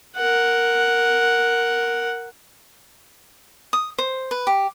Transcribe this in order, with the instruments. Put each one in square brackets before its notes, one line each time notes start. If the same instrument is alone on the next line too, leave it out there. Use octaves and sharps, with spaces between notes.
[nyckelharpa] A#4 F#5
[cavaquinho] D#6
C5
B4
G4